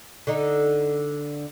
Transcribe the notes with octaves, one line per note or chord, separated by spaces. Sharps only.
D3 D#4